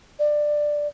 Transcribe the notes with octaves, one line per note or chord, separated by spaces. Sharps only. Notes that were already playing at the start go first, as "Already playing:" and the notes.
D5